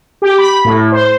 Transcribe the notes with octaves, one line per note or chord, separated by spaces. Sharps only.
G4
B5
A2
C5